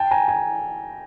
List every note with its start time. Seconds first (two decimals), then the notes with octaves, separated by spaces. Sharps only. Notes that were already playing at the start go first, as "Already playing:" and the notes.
Already playing: G5 A5
0.11 G#5 A#5
0.28 G#5 A#5